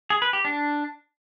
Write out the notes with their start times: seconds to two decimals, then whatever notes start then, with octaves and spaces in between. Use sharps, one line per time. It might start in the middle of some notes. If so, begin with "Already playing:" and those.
0.10 G#4
0.22 B4
0.33 G4
0.45 D4